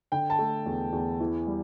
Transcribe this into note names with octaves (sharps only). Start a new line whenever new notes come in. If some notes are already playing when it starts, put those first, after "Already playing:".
D3 G5
A5
A3
E2
E2
E3
G3